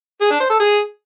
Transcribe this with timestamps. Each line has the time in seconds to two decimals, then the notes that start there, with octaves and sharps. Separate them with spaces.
0.21 G#4
0.30 D4
0.40 C5
0.50 A4
0.60 G#4